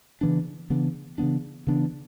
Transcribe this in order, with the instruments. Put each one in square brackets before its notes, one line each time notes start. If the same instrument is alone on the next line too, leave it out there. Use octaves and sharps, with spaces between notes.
[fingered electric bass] C#3 E3 B3 D4
C#3 E3 B3 D4
C#3 E3 B3 D4
C#3 E3 B3 D4